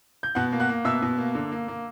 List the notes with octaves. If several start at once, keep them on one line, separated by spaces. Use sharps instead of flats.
G6
B2 F#5 F#6
A#3
F#5 F#6
A#3
B2 E5 E6
B2
A#3
D3
A#3
A#3